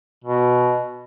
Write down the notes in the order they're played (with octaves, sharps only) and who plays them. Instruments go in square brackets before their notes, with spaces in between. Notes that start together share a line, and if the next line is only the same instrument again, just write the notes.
[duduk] B2